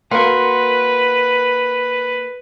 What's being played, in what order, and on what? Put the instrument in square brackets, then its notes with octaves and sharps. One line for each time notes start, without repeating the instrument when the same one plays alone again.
[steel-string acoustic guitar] A#3 F#4 F#5 [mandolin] A#4 C6 [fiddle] B4